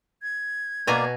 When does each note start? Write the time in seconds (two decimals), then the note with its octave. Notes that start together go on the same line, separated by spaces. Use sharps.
0.22 G#6
0.87 B2 A#3 B4 D5 G#5 A#5 C#6